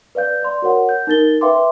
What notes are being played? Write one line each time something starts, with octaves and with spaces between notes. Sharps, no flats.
B4 D5 F5 G6
D5 C6
F#4 A#4 C#5 F#5
G6
D#4 A#4 A6 G7
B4 E5 F5 G5 C6 D6